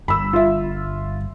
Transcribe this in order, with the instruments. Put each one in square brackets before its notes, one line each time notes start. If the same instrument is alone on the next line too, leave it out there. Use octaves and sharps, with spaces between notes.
[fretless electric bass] G1 G2 [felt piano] B5 E6
[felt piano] F4 E5